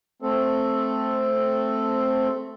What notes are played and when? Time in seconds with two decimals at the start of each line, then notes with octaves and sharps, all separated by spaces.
0.22 A3 C4 A4